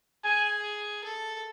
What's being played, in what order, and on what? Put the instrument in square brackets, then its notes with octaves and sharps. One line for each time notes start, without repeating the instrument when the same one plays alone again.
[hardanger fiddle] G#4 [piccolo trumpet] G#5
[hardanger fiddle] A4